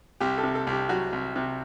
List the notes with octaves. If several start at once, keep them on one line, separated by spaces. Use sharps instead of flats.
C2 G4
A4
C3
A4
C2
G4
F#3 F#4
C2
C3